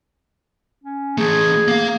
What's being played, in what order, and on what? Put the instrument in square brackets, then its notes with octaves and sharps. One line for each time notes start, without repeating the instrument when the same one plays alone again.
[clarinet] C#4
[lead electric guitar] E3 A3 [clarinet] G#4
[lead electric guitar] A#3 F5